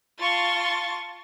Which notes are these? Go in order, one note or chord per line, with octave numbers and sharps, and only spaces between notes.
F4 A5 C6 C#6 A6